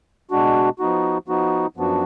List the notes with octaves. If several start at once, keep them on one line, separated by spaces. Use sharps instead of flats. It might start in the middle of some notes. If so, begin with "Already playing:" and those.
B2 G#3 D4 F#4
F3 B3 D#4 F#4
F3 B3 D#4 F#4
F#2 F3 B3 D4 F#4